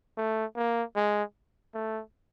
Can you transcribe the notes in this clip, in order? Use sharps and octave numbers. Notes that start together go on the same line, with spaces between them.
A3
A#3
G#3
A3